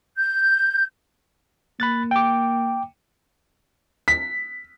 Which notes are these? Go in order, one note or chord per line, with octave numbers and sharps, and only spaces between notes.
G6
A#3 B5 F#6 A6
G5 D6
B6